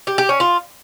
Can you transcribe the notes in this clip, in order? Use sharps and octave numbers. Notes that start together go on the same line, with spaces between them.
G4
G4
C#4
F4